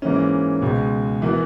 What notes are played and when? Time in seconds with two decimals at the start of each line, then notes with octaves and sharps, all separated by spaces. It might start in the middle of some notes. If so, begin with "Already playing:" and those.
0.02 G#2 E3 A#3 C#4
0.62 C#2 B2 G#3
1.22 E3 B3 F#4 A#4